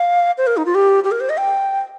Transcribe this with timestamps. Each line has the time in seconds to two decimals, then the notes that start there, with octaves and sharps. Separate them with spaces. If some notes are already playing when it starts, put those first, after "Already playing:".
Already playing: F5
0.38 C5
0.47 A#4
0.57 D#4
0.66 F4
0.75 G4
1.04 G4
1.12 A#4
1.20 C5
1.30 D#5
1.38 G5